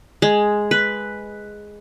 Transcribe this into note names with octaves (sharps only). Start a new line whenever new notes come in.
G#3
B4